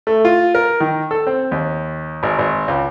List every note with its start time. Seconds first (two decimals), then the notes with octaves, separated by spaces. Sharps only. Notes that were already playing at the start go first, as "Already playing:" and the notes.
0.07 A3
0.25 F4
0.55 A#4
0.80 D#3
1.11 A4
1.27 C4
1.51 D#2
2.23 G#1
2.39 G#1
2.68 C#2